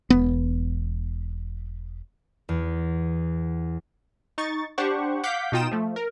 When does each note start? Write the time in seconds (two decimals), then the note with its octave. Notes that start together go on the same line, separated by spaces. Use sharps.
0.10 E1 B3
2.49 E2
4.38 D#4 C#6 A6
4.78 D4 G4 C5 F#5 C#6
5.24 F5 F#5 D6 G6 B6
5.52 B2 D#4 F4 G5 D#6 E7
5.71 F3 A3
5.96 A#4